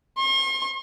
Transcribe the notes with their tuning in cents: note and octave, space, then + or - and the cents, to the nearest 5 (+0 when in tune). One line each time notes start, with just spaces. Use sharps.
C6 +45